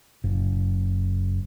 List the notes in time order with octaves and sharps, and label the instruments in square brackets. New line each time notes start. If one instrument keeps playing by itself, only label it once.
[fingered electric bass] F#1